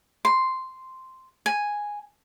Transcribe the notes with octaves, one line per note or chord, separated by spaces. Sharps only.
C6
G#5